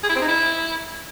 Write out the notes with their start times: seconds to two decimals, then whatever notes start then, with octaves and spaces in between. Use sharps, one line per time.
0.03 G#4
0.09 E4
0.16 C4
0.22 D#4
0.28 E4